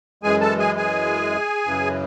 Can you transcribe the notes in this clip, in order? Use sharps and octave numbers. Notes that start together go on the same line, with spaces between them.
F#2 E3 G#3 G#4 G#5
A4 A5
G#4 G#5
G#4 G#5
F#2 C#3 E3